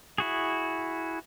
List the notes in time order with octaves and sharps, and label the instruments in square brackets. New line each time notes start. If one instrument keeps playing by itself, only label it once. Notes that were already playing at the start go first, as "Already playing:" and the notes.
[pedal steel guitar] E4 F#4 G#4